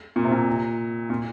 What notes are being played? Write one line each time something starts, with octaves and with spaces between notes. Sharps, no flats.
A#2
C3
A#2
A#2